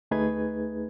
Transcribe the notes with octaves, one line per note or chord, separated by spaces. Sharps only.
D2 A3 D#4 G#4 B4 G#6